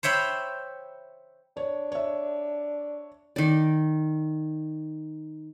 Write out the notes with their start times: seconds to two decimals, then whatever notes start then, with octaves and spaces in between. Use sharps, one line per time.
0.03 C5 C#5 E5 G5 B5
1.57 D4 C#5
1.92 C#5 E5
3.36 D#3 D5